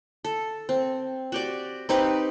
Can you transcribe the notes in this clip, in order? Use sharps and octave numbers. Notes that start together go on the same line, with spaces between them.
A4
C4
F#4 G4 D5
C4 D#4 G4 B4